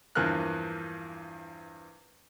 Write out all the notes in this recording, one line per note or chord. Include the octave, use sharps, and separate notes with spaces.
E2 G2 F3 A#3 F6 F#6